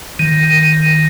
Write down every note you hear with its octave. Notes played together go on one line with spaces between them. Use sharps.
D#3